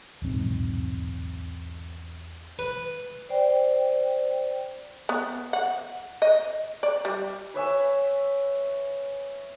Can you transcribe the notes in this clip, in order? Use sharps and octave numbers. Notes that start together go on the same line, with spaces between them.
D#1 B1 E2 G#2 C4
B4
C5 D5 G5
B3
F#5
D#5
D5
G3
B4 C#5 E5 G#5